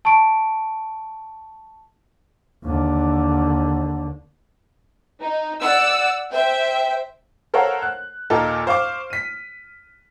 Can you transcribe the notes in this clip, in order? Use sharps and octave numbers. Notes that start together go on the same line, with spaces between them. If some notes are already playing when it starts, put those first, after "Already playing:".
A5 C#6 D7
D#2 D3
D#4
D5 F#5 E6
C5 E5 G5
A4 A#4 C5 C#5 F5 F#5
F#6
D#2 A#2 D#4 F4 A4
C5 F5 C#6 D6 F6
B6 D#7